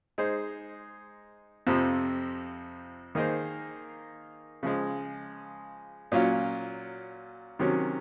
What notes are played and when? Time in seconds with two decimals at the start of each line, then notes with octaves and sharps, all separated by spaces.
0.18 G#3 D#4 G#4 C5
1.67 F2 C3 F3
3.15 D#3 A#3 D#4 G#4 C5
4.63 C#3 F3 G#3
6.12 A#2 F#3 C#4 F4
7.59 C3 D#3 F#3 C#4